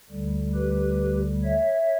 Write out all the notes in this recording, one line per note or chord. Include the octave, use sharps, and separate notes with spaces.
D2 D3 G3
G4 B4
C#5 E5